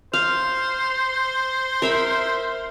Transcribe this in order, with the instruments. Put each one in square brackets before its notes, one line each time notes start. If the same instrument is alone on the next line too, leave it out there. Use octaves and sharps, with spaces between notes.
[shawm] C5 [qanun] F5
[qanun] A#4 E5 B5